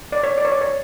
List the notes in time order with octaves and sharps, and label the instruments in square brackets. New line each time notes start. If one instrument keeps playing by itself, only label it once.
[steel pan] D5
C#5
D5
C#5
D5
C#5